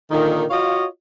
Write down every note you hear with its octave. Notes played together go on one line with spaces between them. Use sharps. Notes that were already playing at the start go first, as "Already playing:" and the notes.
A#2 D3 D#3
F4 F#4 C#5 D#5 F5